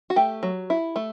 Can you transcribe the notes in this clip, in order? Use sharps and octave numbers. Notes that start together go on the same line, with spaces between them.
F#4
A3 G4
F#3
E4
A3